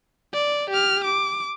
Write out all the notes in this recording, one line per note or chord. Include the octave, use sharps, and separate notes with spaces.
D5
G4 F6
D6